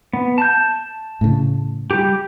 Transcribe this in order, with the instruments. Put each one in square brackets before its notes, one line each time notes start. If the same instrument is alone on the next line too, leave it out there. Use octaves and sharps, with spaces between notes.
[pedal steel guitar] B3
A5 G6
[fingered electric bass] A2 C#3
[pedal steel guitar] G3 G4